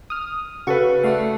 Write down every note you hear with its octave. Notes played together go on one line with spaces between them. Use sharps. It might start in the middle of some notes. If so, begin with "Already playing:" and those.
D#6 F6
C#3 F#4 A4 B4 C#6
A3 D5 F5 F#5